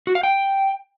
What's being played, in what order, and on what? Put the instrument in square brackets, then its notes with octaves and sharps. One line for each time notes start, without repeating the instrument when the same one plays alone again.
[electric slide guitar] F#4
F5
G5